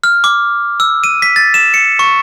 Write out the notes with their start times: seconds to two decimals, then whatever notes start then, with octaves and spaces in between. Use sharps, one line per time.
0.04 F6
0.24 D6
0.80 E6
1.04 D#7
1.22 B6
1.36 A6
1.54 E7
1.74 C#7
1.99 C#6